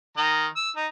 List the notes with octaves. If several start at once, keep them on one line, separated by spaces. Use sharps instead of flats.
D#3 D#5 A#5
E6
D#4